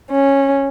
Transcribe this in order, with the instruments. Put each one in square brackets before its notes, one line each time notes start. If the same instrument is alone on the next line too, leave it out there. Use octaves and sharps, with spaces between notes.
[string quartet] C#4